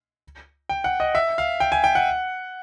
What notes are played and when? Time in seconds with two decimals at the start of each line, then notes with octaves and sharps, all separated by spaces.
0.69 G5
0.84 F#5
1.00 D#5
1.15 E5
1.38 F5
1.60 G5
1.72 G#5
1.84 G5
1.95 F#5